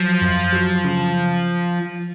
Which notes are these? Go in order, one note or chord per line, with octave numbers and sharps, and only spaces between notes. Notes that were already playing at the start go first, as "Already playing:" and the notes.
Already playing: F3 F#3
F#2
F#3
C#3